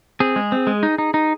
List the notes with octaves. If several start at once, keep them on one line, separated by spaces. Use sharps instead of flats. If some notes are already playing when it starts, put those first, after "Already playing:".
C4 G#4
G#3
C4
G#3
D#4
D#4
D#4